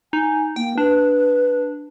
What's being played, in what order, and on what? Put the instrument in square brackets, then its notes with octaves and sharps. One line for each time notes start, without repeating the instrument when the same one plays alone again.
[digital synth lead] D#4 [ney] G#5
[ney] A#3 [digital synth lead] G5
[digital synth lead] D4 [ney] B4